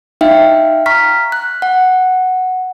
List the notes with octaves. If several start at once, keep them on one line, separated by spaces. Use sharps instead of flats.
D#4 E5 F5 G5
A#5 C#6 F6 B6
F#6
F#5